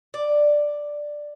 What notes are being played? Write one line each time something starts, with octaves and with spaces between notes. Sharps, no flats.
D5